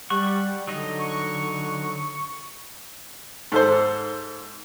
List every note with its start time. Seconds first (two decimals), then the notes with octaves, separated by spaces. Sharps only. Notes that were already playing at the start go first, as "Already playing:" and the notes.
0.10 G3 F#5 C#6
0.67 D3 F#3 D#4 D#5
0.98 C#6
3.52 G#2 A4 C5